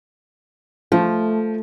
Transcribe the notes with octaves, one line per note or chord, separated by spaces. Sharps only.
F3 A3